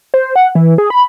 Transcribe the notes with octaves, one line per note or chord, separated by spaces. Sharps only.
C5
F#5
E3
G#4
B5